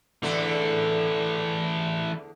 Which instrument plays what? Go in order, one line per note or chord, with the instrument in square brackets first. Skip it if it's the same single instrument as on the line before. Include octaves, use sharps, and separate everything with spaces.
[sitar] E2 D3 A4 [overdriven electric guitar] E3 A3